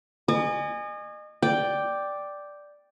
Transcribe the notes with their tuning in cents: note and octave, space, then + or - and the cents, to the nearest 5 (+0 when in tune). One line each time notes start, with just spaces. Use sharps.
D#5 -35 G#5 -15 C#6 +45
D5 +0 G5 +0